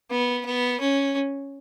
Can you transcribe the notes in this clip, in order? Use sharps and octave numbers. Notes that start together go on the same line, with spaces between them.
B3
B3
C#4